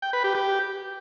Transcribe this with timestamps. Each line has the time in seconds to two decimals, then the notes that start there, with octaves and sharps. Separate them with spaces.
0.02 G5
0.13 B4
0.24 G4
0.35 G4